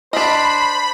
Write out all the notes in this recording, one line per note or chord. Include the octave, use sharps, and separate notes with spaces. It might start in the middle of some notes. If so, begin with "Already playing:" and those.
D4 C5 D#5 B5